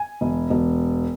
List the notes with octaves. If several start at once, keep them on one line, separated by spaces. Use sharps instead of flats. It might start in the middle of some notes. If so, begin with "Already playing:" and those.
Already playing: G#5
E1
E1